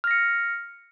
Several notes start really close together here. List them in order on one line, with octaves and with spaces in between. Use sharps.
F6 A#6 C#7